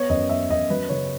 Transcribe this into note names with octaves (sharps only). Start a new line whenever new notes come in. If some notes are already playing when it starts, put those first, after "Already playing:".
Already playing: B3 C#5
F#2 D#5
B3 E5
F#2 D#5
F#3 B4
C#3 C#5